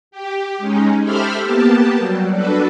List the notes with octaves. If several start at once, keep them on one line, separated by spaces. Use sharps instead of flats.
G4
G#3 C#4 D#4
G4 A4 C5 E5 B5 F6
A#3 B3 G4 A5
F#3 G3
D4 F#4 A4 B4